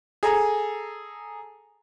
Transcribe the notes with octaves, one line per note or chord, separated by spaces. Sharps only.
G#4 A4 G#5 A#5